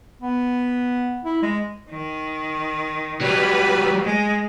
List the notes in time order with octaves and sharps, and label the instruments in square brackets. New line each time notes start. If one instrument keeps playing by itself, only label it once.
[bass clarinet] B3
E4
G#3
[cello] D#3
[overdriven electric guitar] F#3 G3 [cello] B4
[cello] G#3